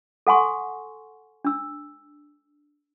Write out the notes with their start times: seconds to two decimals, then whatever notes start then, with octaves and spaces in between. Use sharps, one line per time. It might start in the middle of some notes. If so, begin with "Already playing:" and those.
0.27 A4 F#5 G#5 C6 C#6
1.45 D4 E6